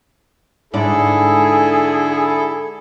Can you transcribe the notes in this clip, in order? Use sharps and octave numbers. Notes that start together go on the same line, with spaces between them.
G#2 D3 E4 G#4 A4 D5